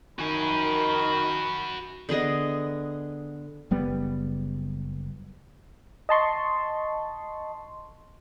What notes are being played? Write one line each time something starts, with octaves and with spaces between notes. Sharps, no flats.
D#3 F#4 G#5 B5
D3 B3 G#4 D#5
F#1 G3 B3
D#5 A5 C6 C#6